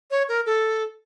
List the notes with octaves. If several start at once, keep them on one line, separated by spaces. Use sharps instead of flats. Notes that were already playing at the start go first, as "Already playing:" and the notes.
C#5
A#4
A4